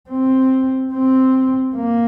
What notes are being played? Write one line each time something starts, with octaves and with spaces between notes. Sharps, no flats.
C4
C4
A#3